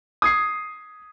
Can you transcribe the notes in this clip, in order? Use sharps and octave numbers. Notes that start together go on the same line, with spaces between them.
D#6 G#6 C7